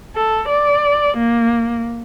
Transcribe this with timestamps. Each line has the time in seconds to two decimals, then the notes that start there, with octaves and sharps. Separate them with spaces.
0.16 A4
0.48 D5
1.17 A#3